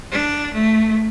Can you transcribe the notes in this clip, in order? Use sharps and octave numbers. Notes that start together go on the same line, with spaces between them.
D4
A3